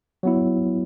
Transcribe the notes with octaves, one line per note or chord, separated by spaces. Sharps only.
F#3 B3 E4